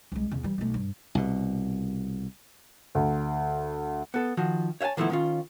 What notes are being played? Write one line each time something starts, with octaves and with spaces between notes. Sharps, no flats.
C2 G#3
E2 C#3
E3 G3
B1 A3
G2
C2 B2
D2
B3 A4
D#3 F3 F#4
C#5 E5 F#5 G#5 A5
D#3 F3 A3 B3 E4
D#3 C#4 F4